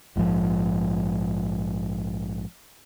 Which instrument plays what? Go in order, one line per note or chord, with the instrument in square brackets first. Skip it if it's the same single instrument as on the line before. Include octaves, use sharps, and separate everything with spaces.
[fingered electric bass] A#1 G#2 D3 F3